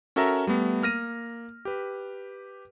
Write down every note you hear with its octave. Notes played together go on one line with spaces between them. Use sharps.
C#4 F#4 A4 A#4 E5 A#5
G3 A3 B3
A#3 F6 A#6 D#7
G4 B4